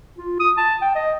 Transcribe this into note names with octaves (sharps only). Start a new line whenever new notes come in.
F4
D#6
A5
G5
D#5